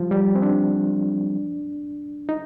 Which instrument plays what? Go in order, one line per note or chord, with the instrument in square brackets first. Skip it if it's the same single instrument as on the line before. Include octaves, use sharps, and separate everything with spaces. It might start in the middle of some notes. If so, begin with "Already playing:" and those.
Already playing: [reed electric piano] F3 G3
G3
C4
D4
D#4